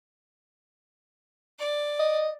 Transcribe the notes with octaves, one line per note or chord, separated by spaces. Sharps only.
D5
D#5